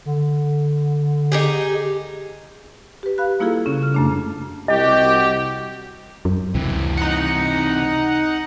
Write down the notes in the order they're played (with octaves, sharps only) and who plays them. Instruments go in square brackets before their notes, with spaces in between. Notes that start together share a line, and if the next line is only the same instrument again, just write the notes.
[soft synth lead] D3
[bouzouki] D#4 G4 G#4
[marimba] G4 B4
F5 B5 F#6
G3 A#3 E4 F4 G#4 A4
C#3 C#4
F6
F#2 A3 D4
[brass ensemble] C2 F#4 [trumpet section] G4 [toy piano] D#5
[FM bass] F#2
[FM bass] C#2 [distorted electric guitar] C3 E3
[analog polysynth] D#4 F#5